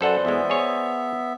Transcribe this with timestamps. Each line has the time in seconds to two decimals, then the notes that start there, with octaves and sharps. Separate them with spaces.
0.01 F#2 A4 B4 C5 D5 F#5 C6
0.25 E2 G#3 B3 E5
0.50 G#4 C#5